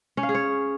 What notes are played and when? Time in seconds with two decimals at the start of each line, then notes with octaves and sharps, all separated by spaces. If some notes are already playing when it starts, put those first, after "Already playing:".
0.17 C#4
0.23 F5
0.29 G#4
0.35 C#5